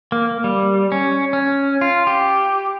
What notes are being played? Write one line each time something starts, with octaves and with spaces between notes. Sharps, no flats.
A#3
G3
C#4
C#4
F4
G4